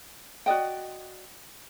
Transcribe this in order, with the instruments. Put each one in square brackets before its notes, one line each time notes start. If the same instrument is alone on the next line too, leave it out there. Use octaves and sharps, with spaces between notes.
[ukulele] F#4 D5 D#5 G5